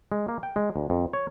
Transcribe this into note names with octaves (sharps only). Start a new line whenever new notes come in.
G#3
A#3
G5
G#3
D2
F2
C#5